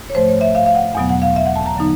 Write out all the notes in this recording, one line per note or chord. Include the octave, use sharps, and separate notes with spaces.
C#5
G#2 F3 A3 C5
C#5
E5
F5
F5
F#5
E2 B2 F#3 B3 F#5
F#5
F5
E5
F#5
A5
A#5
D3 F#3 B3 D#4